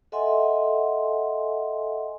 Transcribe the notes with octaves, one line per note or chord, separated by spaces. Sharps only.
A4 D#5 E5 F#5 G#5 C6